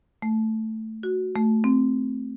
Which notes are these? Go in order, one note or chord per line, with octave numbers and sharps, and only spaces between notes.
A3
F#4
A3
C4